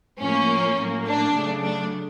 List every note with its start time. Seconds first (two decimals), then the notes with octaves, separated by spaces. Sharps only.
0.20 A2 F3 A#3 C#4
0.77 A2 F#3 A#3
1.06 D4
1.34 C#3 F#3 A3
1.63 D4